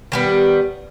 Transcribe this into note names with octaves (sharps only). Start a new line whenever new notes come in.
D#3 G3 B3